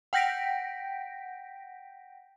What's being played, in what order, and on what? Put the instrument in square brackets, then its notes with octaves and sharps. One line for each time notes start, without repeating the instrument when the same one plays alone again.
[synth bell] F#5 G5 G6 A#6 B6 D7